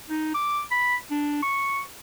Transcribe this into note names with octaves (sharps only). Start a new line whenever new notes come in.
D#4
D6
B5
D4
C#6